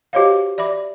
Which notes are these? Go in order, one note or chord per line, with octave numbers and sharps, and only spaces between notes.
F#4 G4 C5 C#5 D#5 F5
D5 E5 B5 D6